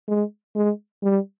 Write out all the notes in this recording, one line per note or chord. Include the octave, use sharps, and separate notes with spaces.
G#3
G#3
G3